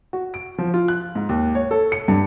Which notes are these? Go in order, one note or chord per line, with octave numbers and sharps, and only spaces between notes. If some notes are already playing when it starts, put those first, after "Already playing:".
F#4
D7
F3
F4
F#6
G#2
D#2
C#5
A4
C#7
G2